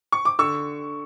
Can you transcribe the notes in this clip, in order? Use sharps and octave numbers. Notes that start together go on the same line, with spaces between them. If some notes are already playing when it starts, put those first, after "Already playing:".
C#6
D6
D3 C#6 E6